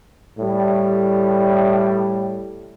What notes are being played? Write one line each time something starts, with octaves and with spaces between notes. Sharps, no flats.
A2 G3